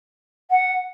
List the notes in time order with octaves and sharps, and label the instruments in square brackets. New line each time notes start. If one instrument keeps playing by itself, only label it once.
[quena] F#5